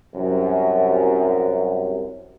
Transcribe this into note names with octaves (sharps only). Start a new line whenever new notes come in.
C2 F#2